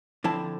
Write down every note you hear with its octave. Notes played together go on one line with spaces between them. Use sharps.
D3 F3 C4 E4 A5